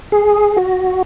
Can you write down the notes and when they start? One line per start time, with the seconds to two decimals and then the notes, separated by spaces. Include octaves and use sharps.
0.12 G#4
0.57 F#4